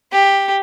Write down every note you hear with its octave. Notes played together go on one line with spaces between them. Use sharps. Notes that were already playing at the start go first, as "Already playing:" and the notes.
G4